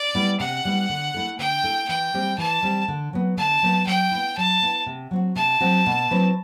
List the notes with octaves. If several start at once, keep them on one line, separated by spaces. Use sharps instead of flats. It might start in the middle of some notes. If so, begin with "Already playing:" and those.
Already playing: D5
G3 B3 E4
C3 F#5
G3 B3 E4
D3
A3 E4 A4
D3 G5
A3 E4 A4
E3 G5
G3 C4 G4
E3 A5
G3 C4 G4
D3
F#3 B3
D3 A5
F#3 B3
F#3 G5
B3 E4
F#3 A5
B3 E4
C3
F#3 C4 F#4
C3 A5
F#3 C4 F#4
B2
F#3 C4 E4 B4